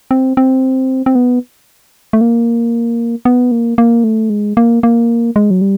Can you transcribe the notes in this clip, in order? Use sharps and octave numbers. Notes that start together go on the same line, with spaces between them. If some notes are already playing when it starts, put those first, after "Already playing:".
C4
C4
C4
B3
A3
A#3
B3
A#3
A#3
A3
G#3
A#3
A#3
G#3
F#3
G3